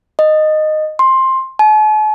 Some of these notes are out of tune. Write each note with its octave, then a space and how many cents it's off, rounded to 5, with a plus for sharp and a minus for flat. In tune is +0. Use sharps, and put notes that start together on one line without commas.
D#5 -10
C6 +15
A5 -45